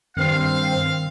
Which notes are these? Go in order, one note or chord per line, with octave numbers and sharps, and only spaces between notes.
G2 D#3 C4 F5